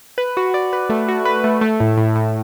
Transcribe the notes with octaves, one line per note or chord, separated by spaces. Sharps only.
B4
F#4
D5
B4
A3
F#4
B4
A3
A3
A2
A2
A2